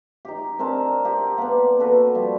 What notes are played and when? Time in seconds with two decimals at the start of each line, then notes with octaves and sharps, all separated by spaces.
0.25 D#4 G4
0.59 C4 D4 A#4 A5
1.05 G4 A#4 F#5
1.38 A#3 B3
1.80 F#4 A4 B4
2.15 F3 G3